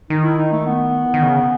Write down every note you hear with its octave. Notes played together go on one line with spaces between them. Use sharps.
D#3 D#4
E4
D#4
A3
B3
E3
D#3
C#3